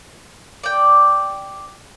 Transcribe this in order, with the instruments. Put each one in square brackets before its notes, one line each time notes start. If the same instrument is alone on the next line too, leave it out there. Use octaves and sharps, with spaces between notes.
[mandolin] D5 G5